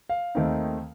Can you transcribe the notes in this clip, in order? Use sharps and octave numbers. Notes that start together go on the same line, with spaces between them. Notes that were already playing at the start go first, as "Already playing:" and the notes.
F5
D#2 D#3 A3 C4 D#4